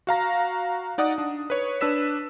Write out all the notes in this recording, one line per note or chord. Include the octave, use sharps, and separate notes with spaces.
F#4 F5 A#5 A#6
D#4 D5 F#5 D#6
D4
B4 C#5
D4 B4 E6 B6 E7